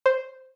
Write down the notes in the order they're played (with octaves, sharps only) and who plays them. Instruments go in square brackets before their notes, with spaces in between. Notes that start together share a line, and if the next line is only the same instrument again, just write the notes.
[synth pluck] C5